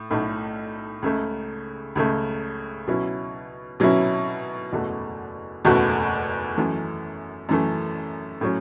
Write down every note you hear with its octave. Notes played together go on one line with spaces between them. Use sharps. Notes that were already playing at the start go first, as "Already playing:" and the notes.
Already playing: A2
B1 A2 A3
C#2 C#3 A3
C#2 C#3 A3
B2 F#3 C#4 E4
B2 F#3 C#4 E4
F#1 E2 B2 A3 F#4
F#1 E2 B2 A3 F#4
F#2 E3 A3
F#2 E3 A3
A2 F#3 C#4